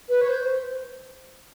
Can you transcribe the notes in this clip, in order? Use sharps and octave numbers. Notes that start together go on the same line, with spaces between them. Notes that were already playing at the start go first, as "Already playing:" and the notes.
B4
C#5
C5